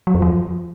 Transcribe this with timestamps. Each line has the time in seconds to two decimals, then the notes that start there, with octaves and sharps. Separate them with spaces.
0.07 F#3
0.15 F2
0.22 F3